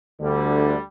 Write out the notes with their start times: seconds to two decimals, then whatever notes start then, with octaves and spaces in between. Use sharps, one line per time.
0.21 D2 D3 G3